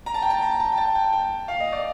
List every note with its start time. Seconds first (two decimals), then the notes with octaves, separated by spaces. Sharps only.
0.06 A#5
0.14 A5
0.22 G5
0.30 A5
0.42 A#5
0.60 A5
0.72 G5
0.78 A5
0.95 G5
1.13 G5
1.48 F5
1.60 D#5
1.72 D5